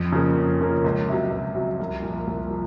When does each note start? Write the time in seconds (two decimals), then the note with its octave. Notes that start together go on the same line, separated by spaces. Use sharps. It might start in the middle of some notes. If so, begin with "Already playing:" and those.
Already playing: F2
0.12 C#3 F3 A#3 C#4
0.37 F2
0.60 C#3 F3 A#3 C#4
0.84 C#2
1.09 C3 F#3
1.32 C#2
1.55 C3 F#3
1.79 C2
2.03 A#2 F3
2.27 C2
2.50 F3